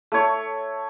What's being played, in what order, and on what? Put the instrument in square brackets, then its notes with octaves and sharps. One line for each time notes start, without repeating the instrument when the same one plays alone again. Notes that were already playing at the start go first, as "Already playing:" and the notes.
[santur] A3 C#5